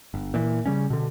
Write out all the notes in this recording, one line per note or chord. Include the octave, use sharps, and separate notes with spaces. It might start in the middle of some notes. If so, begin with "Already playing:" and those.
G1
A#2 E3
C#3 G3 C#4
B2 D3